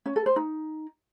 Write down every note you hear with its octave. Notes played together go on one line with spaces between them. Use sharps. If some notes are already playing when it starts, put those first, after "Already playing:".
C#4
A4
C5
D#4